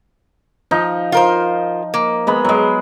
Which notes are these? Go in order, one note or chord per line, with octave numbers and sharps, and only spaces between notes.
F3 D#4
F4 A#4 C5
A#3
G#3 B3 B5
F#3 G#3